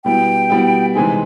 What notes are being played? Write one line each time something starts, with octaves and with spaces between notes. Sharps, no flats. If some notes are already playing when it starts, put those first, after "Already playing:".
B2 G3 B3 E4 G5
B2 G3 B3 E4
C3 E3 G#3 C4 D#4 G#5